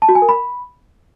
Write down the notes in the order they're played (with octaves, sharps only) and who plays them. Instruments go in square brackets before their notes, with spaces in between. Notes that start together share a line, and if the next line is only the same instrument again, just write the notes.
[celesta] A5
F#4
G#5
A#4
B5